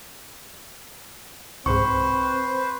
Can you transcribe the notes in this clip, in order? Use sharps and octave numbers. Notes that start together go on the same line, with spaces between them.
C2 G#2 C4 B4 C5 C#6